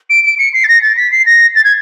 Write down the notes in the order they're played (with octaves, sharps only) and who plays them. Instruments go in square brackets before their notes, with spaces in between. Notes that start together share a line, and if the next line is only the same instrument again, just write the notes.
[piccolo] D7
D7
C#7
C7
A6
A#6
A6
B6
C7
A#6
A6
G#6